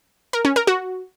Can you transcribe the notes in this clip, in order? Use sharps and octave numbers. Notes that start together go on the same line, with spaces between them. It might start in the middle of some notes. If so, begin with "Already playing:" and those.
A#4
C#4
A#4
F#4